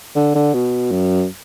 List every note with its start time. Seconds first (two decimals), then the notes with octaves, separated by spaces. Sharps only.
0.15 D3
0.35 D3
0.54 B2
0.91 F#2